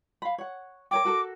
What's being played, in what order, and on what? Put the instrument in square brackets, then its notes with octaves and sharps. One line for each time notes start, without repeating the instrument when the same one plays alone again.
[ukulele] F5 B5
C#5 F#5
[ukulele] A#4 C#5 G5 [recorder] D6
[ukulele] F#4 A4 A#4